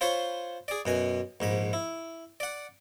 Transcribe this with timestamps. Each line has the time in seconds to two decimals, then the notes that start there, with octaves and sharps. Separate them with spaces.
0.01 F4 C5 C#5 B5
0.68 G#4 D5
0.86 F#2 B2 G#5
1.40 A#1 G#2 B5
1.73 E4
2.40 D5 F#5